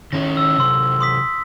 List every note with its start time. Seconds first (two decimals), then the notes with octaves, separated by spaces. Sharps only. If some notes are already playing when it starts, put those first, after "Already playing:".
0.13 D#3 C#4 E4 A#6
0.37 E6
0.58 C3 F#3 C6 E6
1.01 C6 D#6 B6